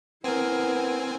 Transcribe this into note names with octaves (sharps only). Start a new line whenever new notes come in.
B3 C4 E4 A#4 G#5